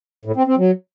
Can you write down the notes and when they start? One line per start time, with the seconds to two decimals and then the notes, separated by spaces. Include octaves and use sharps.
0.25 A2
0.36 C4
0.47 C4
0.58 F#3